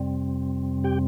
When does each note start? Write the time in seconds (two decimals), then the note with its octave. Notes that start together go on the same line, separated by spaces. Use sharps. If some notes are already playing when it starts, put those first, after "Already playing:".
Already playing: F2 C3 G3 C4
0.84 G4 G5